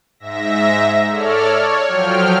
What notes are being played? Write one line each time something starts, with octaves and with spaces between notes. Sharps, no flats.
G#2 E5 A#6
A4 C#5 D5 F6
C#5
F3 F#3 G5 F6